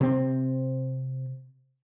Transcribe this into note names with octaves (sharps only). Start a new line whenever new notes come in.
C3 C4